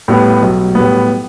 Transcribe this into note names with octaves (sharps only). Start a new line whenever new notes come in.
A2 G3 B3
B1
A2 G3 B3